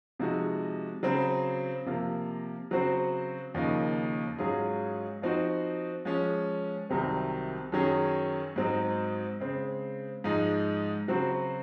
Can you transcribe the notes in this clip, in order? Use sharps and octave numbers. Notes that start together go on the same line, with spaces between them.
C3 F3 G#3 D#4 F#4
C#3 F#3 C4
C3 F3 A#3
C#3 F#3 C4 F#4 C5
D#2 C#3 F3 A#3 D#4
G#2 F#3 C#4 F4 G#4
F3 C4 D#4 F#4
F3 G#3 C#4
C2 C3 D#3 F#3 C4
F#2 D#3 F#3 C#4 G#4
G#2 F#3 C4 D#4
C#3 G#3 C4
G#2 F3 G#3 D#4
C#3 F#3 C4 F#4